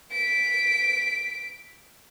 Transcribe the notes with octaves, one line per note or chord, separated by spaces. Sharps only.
B6 D7